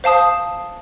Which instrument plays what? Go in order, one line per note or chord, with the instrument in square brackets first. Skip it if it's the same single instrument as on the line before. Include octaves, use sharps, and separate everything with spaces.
[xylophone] C5 F5 A5 D#6